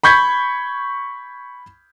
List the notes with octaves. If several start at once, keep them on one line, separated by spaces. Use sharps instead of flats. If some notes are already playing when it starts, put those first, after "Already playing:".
B5 C#6 G6 G#6 B6